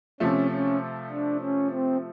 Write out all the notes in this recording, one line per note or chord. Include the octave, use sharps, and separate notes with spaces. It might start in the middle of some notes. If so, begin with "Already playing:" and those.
C3 F3 A3 C#4
C#4
D4
C#4
C4